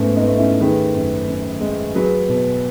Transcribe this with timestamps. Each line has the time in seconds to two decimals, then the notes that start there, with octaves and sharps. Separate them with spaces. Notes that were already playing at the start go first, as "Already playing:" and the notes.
Already playing: G#2 A3 B3 C#4
0.16 B3 D#4
0.27 A3
0.38 C#4 E4
0.60 D#3 G#4 B4
0.94 F#2
1.27 F#2
1.61 G#3
1.95 F#3 G#4 B4
2.28 B2